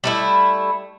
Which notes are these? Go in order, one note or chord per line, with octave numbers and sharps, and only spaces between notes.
G3 A3 E4